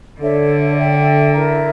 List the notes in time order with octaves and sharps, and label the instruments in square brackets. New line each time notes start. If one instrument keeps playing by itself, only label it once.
[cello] D3 [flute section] D4 A4 C#5 E5
[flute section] A4 E5 G5
E4 A#4 E5 A#5